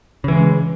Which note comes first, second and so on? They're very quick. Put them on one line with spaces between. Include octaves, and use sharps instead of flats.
C#3 E3 G#3